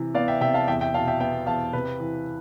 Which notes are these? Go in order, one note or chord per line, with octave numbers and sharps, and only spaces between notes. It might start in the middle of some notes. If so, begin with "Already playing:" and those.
Already playing: C3 E3
B3 D5 F5
E5 G5
C3 E5 G5
F5 A5
E2 E5 G5
E5 G5
B2 F5 A5
E5 G5
B3 E5 G5
E2 F5 A5
C3 B4
E3